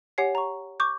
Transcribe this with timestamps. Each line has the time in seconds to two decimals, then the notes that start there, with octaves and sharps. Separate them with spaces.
0.18 G4 C#5 F#5 G#5 C7
0.35 A#5 C#6
0.80 C#6 D6 G6